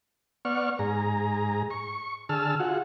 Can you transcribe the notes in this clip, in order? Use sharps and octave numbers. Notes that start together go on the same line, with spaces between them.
B3 D5 F#5 C#6 F6
G#2 G#4 A#5
C#6
D3 G#4 A5 E6 F6
F4 F#4 G#4 F#5